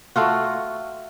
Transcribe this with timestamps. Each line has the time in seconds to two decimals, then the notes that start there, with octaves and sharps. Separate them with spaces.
0.16 A3 F4 F#4